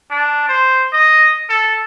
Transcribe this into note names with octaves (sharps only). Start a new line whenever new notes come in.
D4
C5
D#5
A4